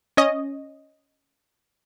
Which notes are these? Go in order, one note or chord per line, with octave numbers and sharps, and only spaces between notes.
C#4 C#5 D#5